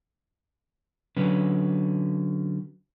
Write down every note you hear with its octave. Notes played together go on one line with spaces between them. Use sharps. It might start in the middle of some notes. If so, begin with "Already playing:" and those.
D3 F#3 C#4 B4